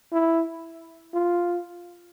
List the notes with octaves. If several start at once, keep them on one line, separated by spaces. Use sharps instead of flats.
E4
F4